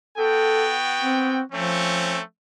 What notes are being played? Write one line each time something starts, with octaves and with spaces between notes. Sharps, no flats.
B3 F#4 A4 G5
C4
F3 A3 C4 C#4